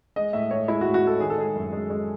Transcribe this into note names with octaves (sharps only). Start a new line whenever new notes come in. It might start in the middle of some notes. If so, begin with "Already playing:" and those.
G#3 D#5
A2 E5
A2 C#5
G#3 E4
F#4
A2
F#4
A2 A4
D#3 G#4
A4
G#3 G#4
F#2
G#3
G#3